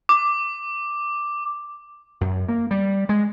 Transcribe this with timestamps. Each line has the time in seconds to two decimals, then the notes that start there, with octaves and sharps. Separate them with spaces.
0.09 D6
2.21 F#2
2.49 A#3
2.71 G3
3.09 G#3